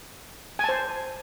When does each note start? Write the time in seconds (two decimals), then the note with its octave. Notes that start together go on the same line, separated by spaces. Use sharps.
0.59 G#5
0.64 A5
0.69 C5